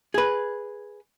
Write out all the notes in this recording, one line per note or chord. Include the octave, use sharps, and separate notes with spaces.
G#4 B4